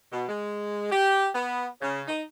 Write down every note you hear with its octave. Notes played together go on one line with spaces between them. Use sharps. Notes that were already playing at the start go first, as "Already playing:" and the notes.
B2
G#3
G4
B3
C#3
D#4